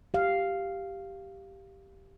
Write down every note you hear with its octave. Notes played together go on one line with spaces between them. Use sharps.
G4 F5